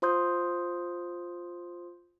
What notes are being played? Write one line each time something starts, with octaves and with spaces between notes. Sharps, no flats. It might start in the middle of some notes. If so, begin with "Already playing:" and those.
F4 C5 C6 D#6 G6